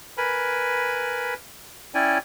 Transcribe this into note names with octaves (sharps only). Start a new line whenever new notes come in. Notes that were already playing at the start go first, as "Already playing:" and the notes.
A#4 B4 G#5 B5
C#4 E4 C#5 D5 G5 G#5